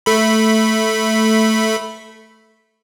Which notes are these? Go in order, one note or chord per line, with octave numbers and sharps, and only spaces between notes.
A3 B5